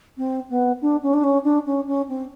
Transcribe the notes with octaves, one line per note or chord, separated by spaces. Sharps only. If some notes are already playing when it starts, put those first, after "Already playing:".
C4
B3
D4
C#4
D4
C#4
D4
C#4
C#4
C4